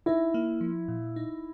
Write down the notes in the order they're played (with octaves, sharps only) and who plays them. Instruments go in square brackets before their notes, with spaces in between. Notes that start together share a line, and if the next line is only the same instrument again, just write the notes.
[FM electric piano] D#4 [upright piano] E4
[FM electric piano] A#3
F3
A#2
D#4